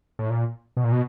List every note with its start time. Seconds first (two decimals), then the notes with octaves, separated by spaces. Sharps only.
0.19 A2
0.30 A#2
0.77 B2
0.84 A#2
0.92 B2